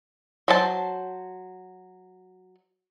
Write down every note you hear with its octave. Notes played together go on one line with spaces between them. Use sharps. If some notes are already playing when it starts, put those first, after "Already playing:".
F#3 C5 A5